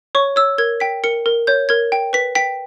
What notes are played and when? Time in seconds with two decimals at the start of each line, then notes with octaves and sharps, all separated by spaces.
0.15 C#5 C#6
0.36 C#5 E6
0.58 A#4 G#6
0.80 G5 B6
1.04 A#4 C#7
1.26 A#4
1.47 C#5 G6
1.69 A#4 G#6
1.92 G5
2.13 B4 B6
2.35 G5 B6